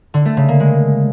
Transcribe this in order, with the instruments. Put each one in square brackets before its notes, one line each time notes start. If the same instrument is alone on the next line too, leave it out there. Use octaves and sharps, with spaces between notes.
[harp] D3
A3
C#3
A#3
G#3